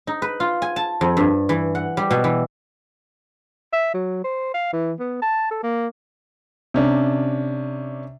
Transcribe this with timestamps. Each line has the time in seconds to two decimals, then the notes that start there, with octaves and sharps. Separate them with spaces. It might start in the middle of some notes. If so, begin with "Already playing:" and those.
0.07 D#4
0.22 B4
0.40 F4
0.62 G#5
0.76 A5
1.01 F2
1.17 G2
1.49 E3
1.75 F#5
1.97 G3
2.11 B2
2.24 E3
3.73 E5
3.94 F#3
4.24 C5
4.54 F5
4.73 E3
4.99 B3
5.22 A5
5.51 A4
5.63 A#3
6.74 C3 C#4 D4